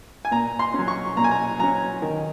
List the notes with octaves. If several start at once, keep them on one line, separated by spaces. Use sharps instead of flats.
G#5
A#2 A#5
C6
F#3 C#4
C#6
A#2 A#5
G#5
A#5
F#3 C#4 A#5
D#3